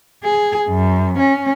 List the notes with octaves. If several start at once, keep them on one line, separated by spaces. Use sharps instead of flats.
G#4
F#2
C#4